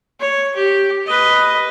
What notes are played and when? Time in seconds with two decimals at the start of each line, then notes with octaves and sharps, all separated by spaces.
0.20 C#5
0.57 G4
1.06 B4 D#5